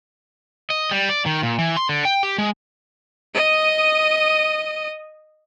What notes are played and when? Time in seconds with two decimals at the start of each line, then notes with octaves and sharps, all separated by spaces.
0.70 D#5
0.91 G3
1.09 D5
1.26 D#3
1.43 A#2
1.59 E3
1.77 C6
1.89 D3
2.05 G5
2.23 G4
2.38 G#3
3.34 D#5 D#6